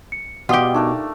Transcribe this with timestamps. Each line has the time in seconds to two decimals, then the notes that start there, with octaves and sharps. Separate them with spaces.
0.12 C#7
0.49 B2 G3 F4 G4 F#5 D#6 G7
0.74 A3 D4 D#4 A#4